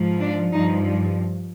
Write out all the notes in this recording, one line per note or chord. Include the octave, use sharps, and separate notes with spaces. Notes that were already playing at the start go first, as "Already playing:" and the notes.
Already playing: G#2 F3
D4
G2 F3 D#4